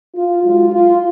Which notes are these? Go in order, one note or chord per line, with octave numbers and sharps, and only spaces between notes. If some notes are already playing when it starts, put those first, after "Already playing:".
F4
G#2 F#3 F4
F4